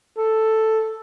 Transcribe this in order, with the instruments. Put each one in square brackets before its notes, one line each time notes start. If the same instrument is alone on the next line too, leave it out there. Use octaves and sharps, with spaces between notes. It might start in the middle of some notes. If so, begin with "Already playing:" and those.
[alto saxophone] A4